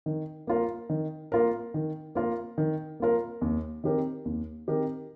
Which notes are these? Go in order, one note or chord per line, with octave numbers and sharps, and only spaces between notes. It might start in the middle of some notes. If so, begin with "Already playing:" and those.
D#3
A#3 F4 A#4
D#3
A#3 F4 A#4
D#3
A#3 F4 A#4
D#3
A#3 F4 A#4
D#2
D#3 C4 G4 A#4
D#2
D#3 C4 G4 A#4